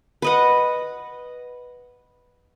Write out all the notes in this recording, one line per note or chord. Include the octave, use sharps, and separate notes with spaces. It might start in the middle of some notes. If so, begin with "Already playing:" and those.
B4 D#5 F#5